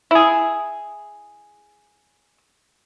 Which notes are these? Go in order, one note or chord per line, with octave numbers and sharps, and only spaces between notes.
E4 G#4